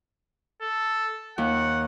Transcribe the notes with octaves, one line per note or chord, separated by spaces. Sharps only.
A4
D#2 F#5